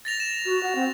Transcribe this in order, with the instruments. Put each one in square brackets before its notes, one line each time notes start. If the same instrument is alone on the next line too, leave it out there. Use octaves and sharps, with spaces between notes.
[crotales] A6 A#6 F7
E7
[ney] F#4
F#5
C4